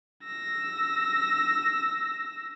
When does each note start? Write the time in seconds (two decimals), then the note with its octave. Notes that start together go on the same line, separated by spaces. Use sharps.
0.24 E6 A#6